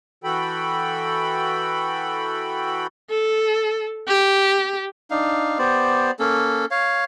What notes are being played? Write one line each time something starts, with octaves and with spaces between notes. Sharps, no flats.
E3 F#4 A4 G5 B5
A4
G4
D4 D#4 F5
B3 G4 C5 D5
A#3 C#4 A4
C#5 F5